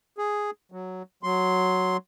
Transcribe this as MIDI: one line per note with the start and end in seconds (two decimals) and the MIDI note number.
0.18 0.50 68
0.72 1.03 54
1.23 1.97 54
1.23 1.97 84